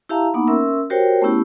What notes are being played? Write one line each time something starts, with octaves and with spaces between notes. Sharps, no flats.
E4 G4 E5 F5 A5 A#5
A#3 B3 D#4 F#5 B5 D6
C#4 A#4 E5 C6 E6
F#4 G4 A#4 C5 C#5 G5
A3 B3 C#4 E4 G4